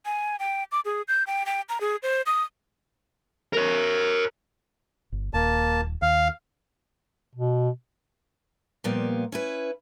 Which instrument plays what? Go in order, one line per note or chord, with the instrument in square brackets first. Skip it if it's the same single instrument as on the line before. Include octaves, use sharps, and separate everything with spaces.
[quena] G#5
G5
D6
G#4
G6
G5
G5
A#5
G#4
C5
D#6
[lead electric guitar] A#4 C#5
[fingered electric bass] G1
[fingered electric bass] D#1 [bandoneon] A#3 A5
[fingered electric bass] D#2 [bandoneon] F5
[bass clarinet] B2
[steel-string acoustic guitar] A#2 F3 G3 A#3 B3
C#4 E4 B4